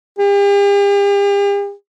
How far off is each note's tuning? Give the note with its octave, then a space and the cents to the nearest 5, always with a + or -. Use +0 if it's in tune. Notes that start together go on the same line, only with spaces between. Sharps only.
G4 +45